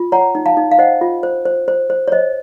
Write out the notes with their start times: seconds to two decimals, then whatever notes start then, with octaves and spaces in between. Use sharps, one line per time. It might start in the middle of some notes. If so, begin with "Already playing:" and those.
Already playing: F4
0.12 C#5 F#5 A#5
0.35 D#4
0.46 F5 A5
0.57 D#4
0.72 F5
0.78 C5 D#5 F#5
1.01 F4
1.23 C5
1.45 C5
1.68 C5
1.90 C5
2.08 C#5
2.12 C5 D#5